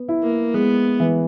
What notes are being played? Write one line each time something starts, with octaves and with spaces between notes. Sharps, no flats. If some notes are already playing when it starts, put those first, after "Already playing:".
Already playing: B3
E4
A#3
G#3 B3
E3